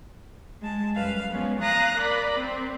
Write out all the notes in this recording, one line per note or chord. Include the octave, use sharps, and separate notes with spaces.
G#3 A5
F#2 G3 B4 F5
F3 G#3 B3 C#4
F5 A#5 D#6 F#6 A#6
A#4 D5 B5
C4